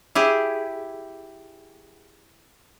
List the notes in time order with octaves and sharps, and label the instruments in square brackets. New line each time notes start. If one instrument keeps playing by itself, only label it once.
[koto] E4 G4 G#4